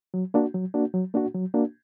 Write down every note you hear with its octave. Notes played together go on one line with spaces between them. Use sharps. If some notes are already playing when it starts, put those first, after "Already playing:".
F#3
A#3 D4 F#4
F#3
A#3 D4 F#4
F#3
A#3 D4 F#4
F#3
A#3 D4 F#4